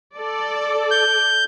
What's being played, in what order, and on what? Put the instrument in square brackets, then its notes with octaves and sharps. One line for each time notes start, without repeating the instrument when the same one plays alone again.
[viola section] A4 D5
[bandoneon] G6